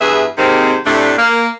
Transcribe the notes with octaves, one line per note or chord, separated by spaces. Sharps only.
E2 G2 B3 G#4 E5
G#2 C3 D#3 A#3 C4 D#4
A2 C3 A3 D4
A#3